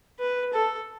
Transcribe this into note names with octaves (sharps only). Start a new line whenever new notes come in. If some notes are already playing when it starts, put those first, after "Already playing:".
B4
A4